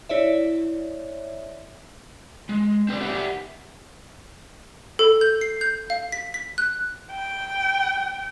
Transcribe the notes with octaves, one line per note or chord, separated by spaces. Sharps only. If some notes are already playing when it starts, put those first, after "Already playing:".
E4 C#5 D5 E5
G#3
C4 B4 D5
G4 D5 E5 F#5
A4
G6
C7
G6
F5
B6
B6
F#6
G5